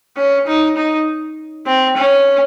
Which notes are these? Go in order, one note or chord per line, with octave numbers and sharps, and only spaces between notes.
C#4
D#4
D#4
C4
C#4